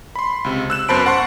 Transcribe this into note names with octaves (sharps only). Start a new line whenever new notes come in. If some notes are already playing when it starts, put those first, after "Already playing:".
B5 C6
C#2 C3
E6 F#6 E7
F#2 B3 C5 A5 B5 D7
F#5 A5 C6 C#6 F#6